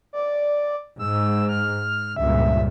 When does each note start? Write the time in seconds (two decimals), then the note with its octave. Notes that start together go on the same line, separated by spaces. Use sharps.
0.13 D5
0.99 G#2 E6
1.49 F6
2.16 C#2 G2 A#2 E5